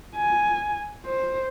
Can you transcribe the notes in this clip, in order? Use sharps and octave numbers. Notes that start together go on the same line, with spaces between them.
G#5
C5